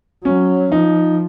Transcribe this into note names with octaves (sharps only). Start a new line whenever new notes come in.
F#3 C#4
F3 D#4